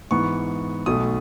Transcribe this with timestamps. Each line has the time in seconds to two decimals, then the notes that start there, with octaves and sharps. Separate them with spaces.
0.11 G#2 E3 B3 C#6
0.86 B1 B2 A3 D#6